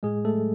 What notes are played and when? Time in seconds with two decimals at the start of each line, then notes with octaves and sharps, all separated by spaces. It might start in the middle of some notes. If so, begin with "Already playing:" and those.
0.03 A2 G#3 G#4
0.25 A3 A4
0.35 F#3